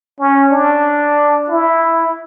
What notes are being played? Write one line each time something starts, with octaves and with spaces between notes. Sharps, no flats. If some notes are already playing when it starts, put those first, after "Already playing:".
C#4
D4
E4